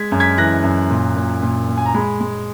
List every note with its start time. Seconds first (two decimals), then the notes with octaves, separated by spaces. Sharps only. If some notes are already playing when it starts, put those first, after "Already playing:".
Already playing: G#3 G#6 B6
0.12 F#2
0.20 G#6 B6
0.38 E3 F#6 A#6
0.64 F#2
0.90 A#2
1.17 A#2
1.43 A#2
1.68 A#2
1.77 G#5
1.86 A#5
1.95 G#3 G#5 B5
2.20 G#3